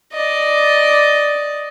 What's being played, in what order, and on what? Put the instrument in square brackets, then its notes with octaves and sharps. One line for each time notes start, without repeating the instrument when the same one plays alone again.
[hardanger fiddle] D5 D#5